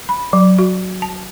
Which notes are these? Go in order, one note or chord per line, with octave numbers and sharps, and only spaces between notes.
B5
F#3
F#4
A5